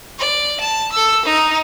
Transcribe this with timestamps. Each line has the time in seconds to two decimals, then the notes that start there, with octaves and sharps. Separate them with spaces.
0.19 D5
0.60 A5
0.92 A4 E6
1.25 D#4